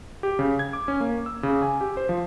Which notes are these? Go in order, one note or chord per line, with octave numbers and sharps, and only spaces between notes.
G4
C#3
G#6
D6
C#4
A#3
E6
C#3
G#5
G4
C5
F3